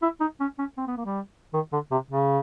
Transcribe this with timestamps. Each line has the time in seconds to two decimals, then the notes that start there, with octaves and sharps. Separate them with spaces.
0.02 E4
0.20 D#4
0.40 C#4
0.59 C#4
0.77 C4
0.87 B3
0.97 A#3
1.06 G3
1.54 D#3
1.72 D3
1.91 C3
2.11 C#3